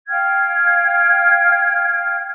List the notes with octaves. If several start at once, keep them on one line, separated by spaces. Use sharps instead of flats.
F5 G5 F6 G#6